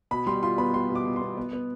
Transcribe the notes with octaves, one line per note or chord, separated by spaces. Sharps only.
B2 B5
G3 C6
F4 C6
B3 B5
G3 C6
B2
D6
B2
C6
B3
B3
B3